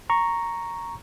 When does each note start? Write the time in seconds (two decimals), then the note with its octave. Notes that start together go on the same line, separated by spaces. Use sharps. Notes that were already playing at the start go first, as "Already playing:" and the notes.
0.10 A#5 C#6